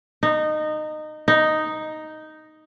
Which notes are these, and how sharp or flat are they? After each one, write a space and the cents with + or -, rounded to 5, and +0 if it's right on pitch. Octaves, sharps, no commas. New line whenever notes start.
D#4 -20
D#4 +0